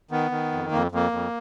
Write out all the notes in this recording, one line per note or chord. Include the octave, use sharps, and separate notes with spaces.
D#3 B3
D#3
F2
F2 A#3
F2 A#3
F2